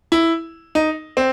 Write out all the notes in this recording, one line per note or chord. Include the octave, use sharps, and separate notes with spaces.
E4
D#4
C4